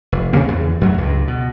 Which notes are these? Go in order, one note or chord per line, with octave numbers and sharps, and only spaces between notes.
F1
C3 D#3 A#3 C4
E2
F#2 F#3 A3
C#2 G2
B2